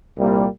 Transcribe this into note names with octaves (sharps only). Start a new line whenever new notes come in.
C2 A#2 G3 A#3